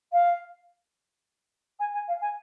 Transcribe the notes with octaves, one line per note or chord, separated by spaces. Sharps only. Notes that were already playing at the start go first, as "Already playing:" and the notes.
F5
G#5
G#5
F5
G#5